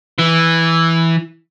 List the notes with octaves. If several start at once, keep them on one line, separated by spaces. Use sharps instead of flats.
E3